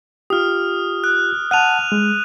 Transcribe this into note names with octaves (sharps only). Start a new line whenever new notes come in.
F4 G4 D#6 F6
F#6
F#5 A5 F#6 D#7 F7
G#3